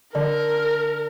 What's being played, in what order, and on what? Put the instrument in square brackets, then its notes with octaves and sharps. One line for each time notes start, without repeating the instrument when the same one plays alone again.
[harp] D3 [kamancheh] A#4